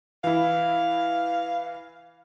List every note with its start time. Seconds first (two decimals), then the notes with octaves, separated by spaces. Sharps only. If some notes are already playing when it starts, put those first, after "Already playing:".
0.24 E3 E4 F5